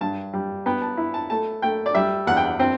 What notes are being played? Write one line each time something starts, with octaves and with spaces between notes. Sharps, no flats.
G2 A5
G3
B3 G5
A5
E4
A5
A3 A5
A3 G5
D5
G3 E5
E2 F#5
G5
F#5
C4 G5